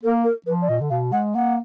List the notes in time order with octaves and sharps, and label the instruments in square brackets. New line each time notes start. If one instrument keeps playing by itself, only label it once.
[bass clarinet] A#3 [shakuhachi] A#4
[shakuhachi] A#4
[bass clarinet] F3 [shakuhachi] B4
[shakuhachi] D5
[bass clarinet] A#2 [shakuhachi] D#5
[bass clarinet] D3
[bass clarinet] B2 [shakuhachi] F5
[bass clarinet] G#3 [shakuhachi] F#5
[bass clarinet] A#3 [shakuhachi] F#5